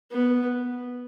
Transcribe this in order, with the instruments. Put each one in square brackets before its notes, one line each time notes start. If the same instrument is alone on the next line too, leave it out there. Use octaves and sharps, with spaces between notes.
[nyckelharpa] B3